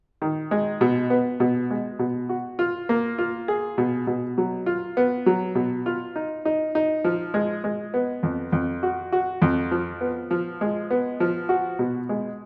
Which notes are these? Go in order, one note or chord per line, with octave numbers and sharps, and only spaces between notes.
D#3
G#3
B2
B3
B2
G#3
B2
F#4
F4
A#3
F4
G#4
B2
B2
F#3
F4
B3
F#3
B2
F4
D#4
D#4
D#4
F3
G#3
G#3
B3
F2
F2
F#4
F#4
F2
F3
B3
F3
G#3
B3
F3
F#4
B2
G#3